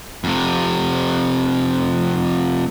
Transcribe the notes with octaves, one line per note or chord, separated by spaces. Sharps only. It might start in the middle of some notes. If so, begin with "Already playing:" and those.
F2 C3